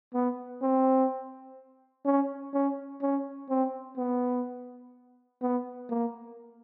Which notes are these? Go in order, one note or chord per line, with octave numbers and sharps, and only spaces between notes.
B3
C4
C#4
C#4
C#4
C4
B3
B3
A#3